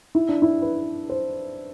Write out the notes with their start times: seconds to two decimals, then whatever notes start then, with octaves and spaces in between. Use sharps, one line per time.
0.15 E4
0.29 D4
0.42 E4
0.62 B4
1.10 C5